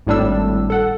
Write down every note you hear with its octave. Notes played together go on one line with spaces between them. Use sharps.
G#1 A2 G3 D4 E6
A4 F#5